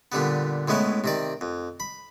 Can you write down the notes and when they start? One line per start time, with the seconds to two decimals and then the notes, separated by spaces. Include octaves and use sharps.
0.12 A#2 D3 G3 B3
0.68 A2 G#3 B3 C#4 E4
1.04 C3 D#3 D5
1.41 F2
1.80 B5